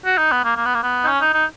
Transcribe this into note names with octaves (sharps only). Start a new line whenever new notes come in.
F#4
D#4
B3
A#3
A#3
B3
A#3
B3
D#4
C#4
D#4
D#4